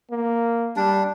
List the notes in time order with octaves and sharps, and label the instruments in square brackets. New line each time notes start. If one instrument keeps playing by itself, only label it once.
[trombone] A#3
[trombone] G3 [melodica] D4